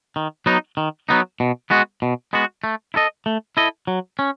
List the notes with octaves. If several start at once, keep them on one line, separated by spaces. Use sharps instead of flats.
D#3
F#3 B3 D#4
D#3
F#3 B3 D#4
B2
G#3 B3 F#4
B2
G#3 B3 F#4
A3
E4 A4 D#5
A3
E4 A4 D#5
F#3
C#4